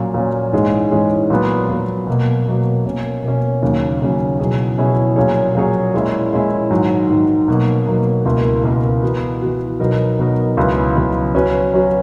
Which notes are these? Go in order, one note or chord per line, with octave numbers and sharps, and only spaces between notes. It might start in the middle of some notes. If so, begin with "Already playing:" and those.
Already playing: A#2 F#3 C#4
A#2 F#3 C#4
G#2 E3 G#3 C#4
G#2 E3 G#3 C#4
A#2 F#3 B3
A#2 F#3 B3
B2 F#3 A#3
B2 F#3 A#3
B2 A#3 C#4
B2 A#3 C#4
D#2 C#3 F#3 C#4
D#2 C#3 F#3 C#4
B2 F#3 C#4 E4 G#4
B2 F#3 C#4 E4 G#4
A#2 F#3 C#4 G#4 C#5
A#2 F#3 C#4 G#4 C#5
A#2 G#3 C#4 E4
A#2 G#3 C#4 E4
G#2 D#3 F#3
G#2 D#3 F#3
B2 F#3 A#3
B2 F#3 A#3
C#2 B2 A#3 E4 A#4
C#2 B2 A#3 E4 A#4
E3 B3 F#4
E3 B3 F#4
B2 F#3 B3 D#4 A#4
B2 F#3 B3 D#4 A#4
C#2 C#3 F#3 B3 E4
C#2 C#3 F#3 B3 E4
F#3 C#4 F#4 B4
F#3 C#4 F#4 B4